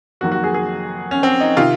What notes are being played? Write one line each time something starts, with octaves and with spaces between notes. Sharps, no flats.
F1 F2 D#3 F#3 A#3 F#4
F#4
G#4
G#4
C#4
C4
D#4
C3 D#3 F4